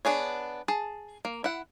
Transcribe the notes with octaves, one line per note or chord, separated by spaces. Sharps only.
B3 D4 G#4 C#5
G#4 A5
A#3
E4 F#5